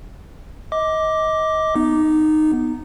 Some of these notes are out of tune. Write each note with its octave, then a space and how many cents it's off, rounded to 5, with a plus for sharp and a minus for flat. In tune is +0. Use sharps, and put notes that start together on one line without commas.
D#5 +25 D6 +0
B3 +0 D#4 -10